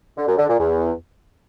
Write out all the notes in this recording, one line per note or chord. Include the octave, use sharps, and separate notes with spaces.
D3
F#2
D3
A#2
E2